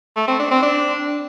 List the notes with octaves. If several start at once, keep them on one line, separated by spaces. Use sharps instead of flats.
A3
C4
D4
C4
D4